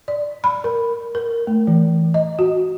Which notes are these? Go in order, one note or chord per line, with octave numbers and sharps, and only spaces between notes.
D5
B5
A#4
A#4
A3
E3
D#5
F#4